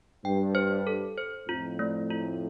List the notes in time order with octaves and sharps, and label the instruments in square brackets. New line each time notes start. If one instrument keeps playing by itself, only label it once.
[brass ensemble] G2 [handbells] G5
[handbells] C5
A4
C5
[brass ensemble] F2 A2 [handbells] F4
[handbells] A3
F4